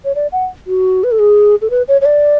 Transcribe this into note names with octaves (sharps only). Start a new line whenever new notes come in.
C#5
D5
F#5
F#4
B4
A4
G#4
A4
B4
C#5
C#5
D5